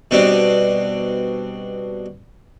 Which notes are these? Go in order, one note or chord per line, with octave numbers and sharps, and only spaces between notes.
B2 G3 C4 D4